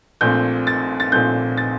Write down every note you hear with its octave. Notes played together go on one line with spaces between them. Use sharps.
A#1 A#2 A3 C4 G6
A6
A6
A#1 A#2 A3 C4 G6
A6